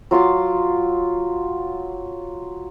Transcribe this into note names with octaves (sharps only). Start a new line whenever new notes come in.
F#3 F4 C6 D6